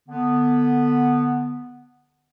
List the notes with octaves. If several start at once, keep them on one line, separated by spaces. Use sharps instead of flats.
D3 B3